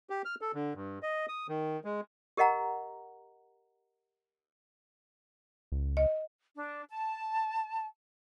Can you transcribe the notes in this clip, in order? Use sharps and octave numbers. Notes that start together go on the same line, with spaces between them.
G4
F6
A4
D3
G2
D#5
D#6
D#3
G#3
G4 A#4 D#5 F#5 A#5
C#2
D#5
D4
A5